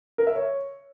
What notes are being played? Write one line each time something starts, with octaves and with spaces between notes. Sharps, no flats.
A#4
E5
C#5